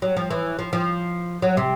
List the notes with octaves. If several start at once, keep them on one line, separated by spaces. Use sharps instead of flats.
F#3
F3
E3
F3
F3
F#3
C3